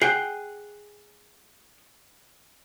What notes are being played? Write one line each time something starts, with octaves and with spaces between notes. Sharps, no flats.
G#4 F#5 G5 C7